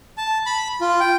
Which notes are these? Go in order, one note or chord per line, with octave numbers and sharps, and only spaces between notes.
A5
B5
F4
G5